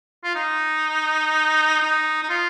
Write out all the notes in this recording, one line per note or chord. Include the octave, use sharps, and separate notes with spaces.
F4
D#4
D#4
D#4
F4